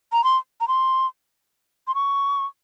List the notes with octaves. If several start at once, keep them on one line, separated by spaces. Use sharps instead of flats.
A#5
C6
A#5
C6
C6
C#6